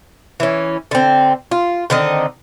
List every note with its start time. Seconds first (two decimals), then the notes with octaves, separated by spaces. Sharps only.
0.40 E3 C#4
0.91 D3 C4
1.51 F4
1.90 D3 D#3 C4 D#5